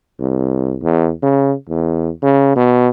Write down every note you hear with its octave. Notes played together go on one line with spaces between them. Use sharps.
C2
E2
C#3
E2
C#3
B2